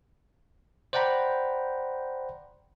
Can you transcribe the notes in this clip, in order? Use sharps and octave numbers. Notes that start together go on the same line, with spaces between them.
C5 D5 F#5 G5 A#5 B5